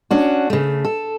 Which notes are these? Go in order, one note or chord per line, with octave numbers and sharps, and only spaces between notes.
C#4 D4 F#4
C#3 A3
A4